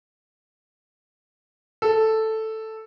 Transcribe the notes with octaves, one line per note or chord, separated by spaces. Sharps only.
A4